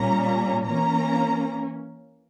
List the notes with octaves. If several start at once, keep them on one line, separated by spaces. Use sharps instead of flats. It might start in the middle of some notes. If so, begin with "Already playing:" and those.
Already playing: A#2 G3 C#4 A#5
E3 A#3 C#4 A#5